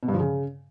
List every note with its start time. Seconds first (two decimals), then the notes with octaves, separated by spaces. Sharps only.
0.03 B2
0.08 G2
0.14 F3
0.20 C#3